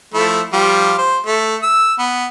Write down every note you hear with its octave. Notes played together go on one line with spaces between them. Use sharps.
F3 A3 E4
F3 G3 F4
C5
A3
E6
B3